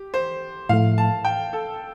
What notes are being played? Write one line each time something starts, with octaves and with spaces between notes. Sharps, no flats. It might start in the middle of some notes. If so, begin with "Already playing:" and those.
Already playing: G4
C5
A2 F3 A3 F5
A5
G5
A4